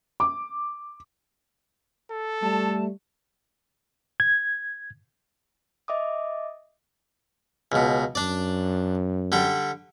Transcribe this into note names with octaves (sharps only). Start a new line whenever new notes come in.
D6
A4
G3 A3 A5
G#6
D#5 E5 D6 D#6
C#2 B2
F#2 D4 D5
D3 G3 G5